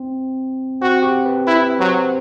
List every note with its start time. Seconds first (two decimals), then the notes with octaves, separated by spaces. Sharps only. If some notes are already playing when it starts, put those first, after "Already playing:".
Already playing: C4
0.81 C4 F#4
1.02 G4
1.26 B4
1.47 E4 B4
1.79 F#3 C5